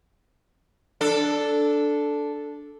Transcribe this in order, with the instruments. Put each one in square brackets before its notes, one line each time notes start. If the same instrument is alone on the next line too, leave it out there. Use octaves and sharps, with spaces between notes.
[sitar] D4 A4